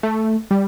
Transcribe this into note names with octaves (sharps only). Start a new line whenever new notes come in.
A3
G3